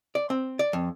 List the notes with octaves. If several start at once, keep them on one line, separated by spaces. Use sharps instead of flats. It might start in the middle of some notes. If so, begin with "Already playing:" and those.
D5
C4
D5
F2